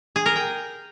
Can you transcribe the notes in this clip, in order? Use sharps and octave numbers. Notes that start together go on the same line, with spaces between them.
G#4
A#4
G5